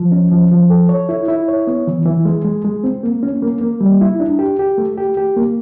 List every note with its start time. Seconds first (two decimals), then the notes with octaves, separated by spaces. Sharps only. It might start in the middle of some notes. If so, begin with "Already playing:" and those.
Already playing: F3
0.12 C#4
0.31 F3
0.51 F3
0.70 A4
0.89 C#5
1.09 E4
1.28 E4
1.48 C#5
1.67 B3
1.87 E3
2.06 E3
2.25 G#3
2.45 G#3
2.65 G#3
2.84 C4
3.03 A#3
3.23 C#4
3.42 A#3
3.61 A#3
3.81 G3
4.01 E4
4.20 D4
4.39 G4
4.59 G4
4.78 A3
4.98 G4
5.17 G4
5.37 A#3